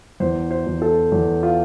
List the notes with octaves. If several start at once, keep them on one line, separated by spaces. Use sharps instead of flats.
E2 C5
C5
E2
A4
E2
F4